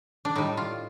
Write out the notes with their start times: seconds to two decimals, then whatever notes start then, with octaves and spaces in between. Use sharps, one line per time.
0.25 D4
0.36 A2 G3 D#4
0.57 F4